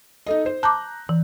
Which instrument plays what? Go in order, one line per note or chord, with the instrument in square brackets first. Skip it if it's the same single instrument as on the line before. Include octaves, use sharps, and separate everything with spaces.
[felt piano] D#4 A4 D#5
C5
[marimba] A5 D6 [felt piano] A#5 F#6 G6
[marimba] E3